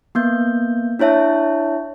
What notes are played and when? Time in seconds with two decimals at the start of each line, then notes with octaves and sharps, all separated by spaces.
0.15 A#3 B3 G6
0.99 D4 E4 C#5 E5 A5